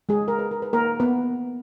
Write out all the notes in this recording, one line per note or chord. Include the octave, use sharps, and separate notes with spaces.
G#3 G#4
A#4
B4
A#4
B4
A#3 A#4
B3 B4